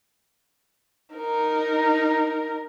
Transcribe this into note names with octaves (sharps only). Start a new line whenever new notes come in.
D#4 A#4